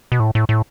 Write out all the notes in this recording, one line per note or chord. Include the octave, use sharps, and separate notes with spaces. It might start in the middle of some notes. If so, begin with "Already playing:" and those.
B2
A2
A2
A2